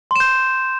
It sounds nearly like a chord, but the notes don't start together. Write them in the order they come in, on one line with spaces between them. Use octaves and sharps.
C6 E7 G6